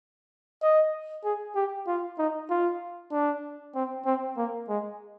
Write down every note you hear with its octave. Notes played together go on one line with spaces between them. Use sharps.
D#5
G#4
G4
F4
D#4
F4
D4
C4
C4
A#3
G#3